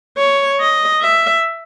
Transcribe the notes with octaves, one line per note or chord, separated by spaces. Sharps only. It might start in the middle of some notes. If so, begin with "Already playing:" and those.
C#5
D#5
E5